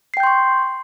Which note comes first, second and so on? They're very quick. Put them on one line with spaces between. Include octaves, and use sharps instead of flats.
C7 G5 G6 C6 C#6